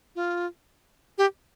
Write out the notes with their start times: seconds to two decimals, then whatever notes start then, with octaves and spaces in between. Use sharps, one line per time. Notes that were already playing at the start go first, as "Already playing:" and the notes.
0.16 F4
1.18 G4